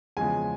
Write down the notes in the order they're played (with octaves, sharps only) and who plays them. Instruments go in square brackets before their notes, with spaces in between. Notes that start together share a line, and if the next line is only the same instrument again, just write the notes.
[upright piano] E2 C#3 F3 G#3 G#5